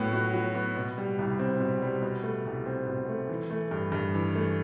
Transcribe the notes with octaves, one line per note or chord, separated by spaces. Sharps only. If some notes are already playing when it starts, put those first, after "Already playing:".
Already playing: A2 F#3 B3
F#4
F#3
B3
B2
G3
C2
C4
B2
G3
B2
A3
C2
C4
B2
A3
E3
A3
G2
G2
E3
A3